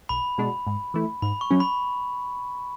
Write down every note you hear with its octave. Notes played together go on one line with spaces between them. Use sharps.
B1 B5
B2 G#3 D4 F#4
G#2
E3 A3 E4
G#2 B5
C#6
F#3 C#4
B5